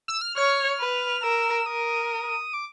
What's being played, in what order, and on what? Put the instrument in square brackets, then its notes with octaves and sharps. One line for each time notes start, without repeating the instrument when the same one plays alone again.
[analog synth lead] E6
F6
[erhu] C#5 [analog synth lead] F6
[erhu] B4
[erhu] A#4 [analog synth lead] E6
[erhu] A#4 [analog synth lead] D#6
[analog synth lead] D6